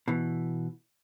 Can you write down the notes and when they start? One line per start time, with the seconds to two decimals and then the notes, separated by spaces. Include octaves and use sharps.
0.08 B2 E3